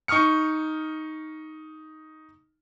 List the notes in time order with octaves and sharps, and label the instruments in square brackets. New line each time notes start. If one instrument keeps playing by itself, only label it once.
[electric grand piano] D#4 C#6 D#6 F6 C#7